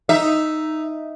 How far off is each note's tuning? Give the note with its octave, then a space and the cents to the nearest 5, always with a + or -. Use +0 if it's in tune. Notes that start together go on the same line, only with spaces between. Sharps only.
D#4 +0 E5 +0